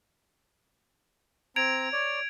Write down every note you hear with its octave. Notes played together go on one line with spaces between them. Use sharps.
C4 A#5 G#6 D7 F7
C#5 D5